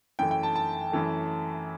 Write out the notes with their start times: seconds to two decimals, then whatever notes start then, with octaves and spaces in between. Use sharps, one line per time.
0.19 F#2 E3 A3 G5
0.31 G5
0.43 A5
0.55 A5
0.92 F#2 E3 A3